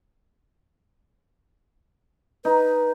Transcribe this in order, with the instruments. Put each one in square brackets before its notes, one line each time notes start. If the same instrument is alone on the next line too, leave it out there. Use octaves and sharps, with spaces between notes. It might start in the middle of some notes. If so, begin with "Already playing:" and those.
[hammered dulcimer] D#4 [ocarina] B4